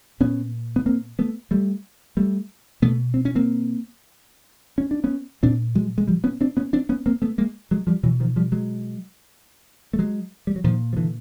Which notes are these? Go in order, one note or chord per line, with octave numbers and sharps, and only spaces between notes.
A#2 B3 C#4
B3
A#3 C4
A3 B3
G3 A3
G3 A3
B2 A3 B3
C4
C#4
A#3 C4
C#4
D4
B3 C#4
A#2 C4 D4
F#3 G#3
G#3
F3 G3
B3 C#4
C4 D4
B3 C#4
C4 D4
B3 C#4
A#3 C4
A3 B3
G#3 A#3
F#3 G#3
F3 G3
B2 E3 F#3
D#3 F3
F3 G3
F#3 G#3
A3
F#3 G#3
G3
F#3
A#2 D#3 F3
F3
D3 E3